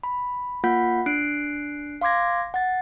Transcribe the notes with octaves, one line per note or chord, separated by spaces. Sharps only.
B5
A#3 F4 F#5 B5 G6 B6
D4 F#6 C7 D7
F5 C6 D6 G#6 A#6
F#5 A6